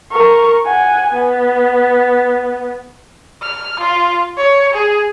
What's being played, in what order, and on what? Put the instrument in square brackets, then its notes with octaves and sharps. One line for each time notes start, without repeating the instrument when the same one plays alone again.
[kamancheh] A#4 C#6
F#5 G#5
B3
[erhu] F6
F4
C#5
G#4